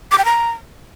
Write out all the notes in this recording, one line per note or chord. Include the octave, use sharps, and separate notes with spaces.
D6
G5
A#5